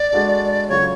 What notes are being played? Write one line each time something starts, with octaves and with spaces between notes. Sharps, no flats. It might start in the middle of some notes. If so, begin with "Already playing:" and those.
Already playing: D5
G#3 D4 F#4 A4
C#3 F#3 A3 F4 C#5